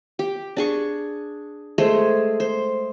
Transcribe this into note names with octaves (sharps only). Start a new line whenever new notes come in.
G4
D4 G#4 C#6
G#3 A3 G#4 C5
C5